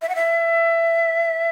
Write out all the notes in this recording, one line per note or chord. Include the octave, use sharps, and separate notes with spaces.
E5
F#5
E5